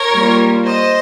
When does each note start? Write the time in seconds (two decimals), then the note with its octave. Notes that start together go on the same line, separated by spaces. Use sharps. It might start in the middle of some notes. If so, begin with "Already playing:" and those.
Already playing: A#4 C#5
0.12 G3 A#3 F4
0.65 C5 D#5